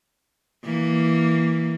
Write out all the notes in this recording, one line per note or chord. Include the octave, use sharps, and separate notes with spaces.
E3 A#3